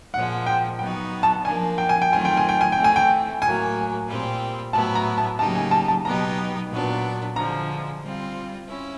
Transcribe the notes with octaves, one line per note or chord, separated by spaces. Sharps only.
A#2 F3 G#3 F#5
G5
F#3 B3 D#4 F#4 G5
A5
F3 A#3 D4 G#5
G5
G#5
G5
D#3 F#3 A3 C4 F4 G#5
G5
G#5
G5
G#5
E3 A3 C4 E4 G5
G#5
G5
A2 F#3 A#3 G#5
A#2 G3 C4
A2 F#3 B3 E4 A5
A#5
A5
C#3 F#3 A#3 D#4 G4 A5
G#5
A5
A5
B2 F#3 B3 D#4 G4 A#5
A#2 F#3 B3 D4
D3 F3 G#3 A#5
G3 C4 F4
C#4 E4